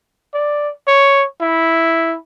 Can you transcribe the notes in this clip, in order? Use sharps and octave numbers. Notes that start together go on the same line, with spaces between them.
D5
C#5
E4